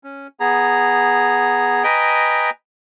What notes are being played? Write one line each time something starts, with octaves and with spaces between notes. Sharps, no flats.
C#4
B3 G#4 A#5
B4 D#5 G5 G#5 A#5